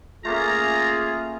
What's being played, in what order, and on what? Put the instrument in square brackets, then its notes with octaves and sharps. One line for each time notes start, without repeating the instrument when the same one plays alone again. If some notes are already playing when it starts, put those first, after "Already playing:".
[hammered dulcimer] A3 A#3 C#4 [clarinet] F4 [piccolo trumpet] G#4 [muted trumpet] A#5